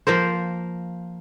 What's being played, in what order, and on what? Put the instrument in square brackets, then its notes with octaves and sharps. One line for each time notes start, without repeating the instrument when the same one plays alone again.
[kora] F3 A#3 A#4 C5